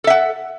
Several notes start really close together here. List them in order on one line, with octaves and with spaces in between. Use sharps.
A4 E5 F#5